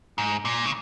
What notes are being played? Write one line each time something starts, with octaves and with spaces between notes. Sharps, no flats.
G#2
A#2
C#3